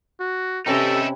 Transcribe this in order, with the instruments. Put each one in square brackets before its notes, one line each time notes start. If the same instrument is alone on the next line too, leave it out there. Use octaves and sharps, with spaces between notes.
[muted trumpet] F#4
[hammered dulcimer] C3 C#4 B4 [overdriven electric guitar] D#4 E4 [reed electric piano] G4 G5 [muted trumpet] A4